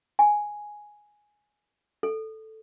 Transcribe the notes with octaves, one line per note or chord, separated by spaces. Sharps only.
G#5
A4